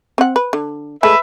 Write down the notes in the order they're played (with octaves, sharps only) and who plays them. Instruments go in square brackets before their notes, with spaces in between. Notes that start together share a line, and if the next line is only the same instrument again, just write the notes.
[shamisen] C4 F#5
B4
D3
[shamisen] G#3 A3 [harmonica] B4 E5